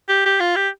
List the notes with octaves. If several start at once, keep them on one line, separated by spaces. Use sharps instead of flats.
G4
G4
F4
G4